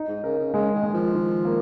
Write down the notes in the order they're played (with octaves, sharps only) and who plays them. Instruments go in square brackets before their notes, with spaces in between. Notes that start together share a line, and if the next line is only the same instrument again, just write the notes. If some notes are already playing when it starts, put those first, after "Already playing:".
Already playing: [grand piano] D#4
[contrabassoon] G#2
[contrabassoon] C#3 [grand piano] A#4
[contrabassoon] C#3
[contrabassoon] C#3 [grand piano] G#3
[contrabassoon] D#3
[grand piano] G#3
[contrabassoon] F3
[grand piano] D#3
A#3